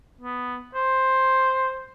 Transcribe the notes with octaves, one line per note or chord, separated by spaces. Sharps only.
B3
C5